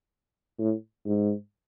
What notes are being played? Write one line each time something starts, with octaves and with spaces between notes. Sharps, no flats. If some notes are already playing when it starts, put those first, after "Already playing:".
A2
G#2